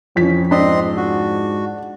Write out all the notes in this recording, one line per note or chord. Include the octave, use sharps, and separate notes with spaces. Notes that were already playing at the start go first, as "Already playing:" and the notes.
F2 E3 F3 C#4 B6
G#2 C4 D4 D#5 C6
F#4